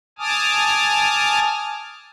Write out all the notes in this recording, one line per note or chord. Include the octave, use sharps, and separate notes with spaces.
G#5 A5 D6 D#6 F6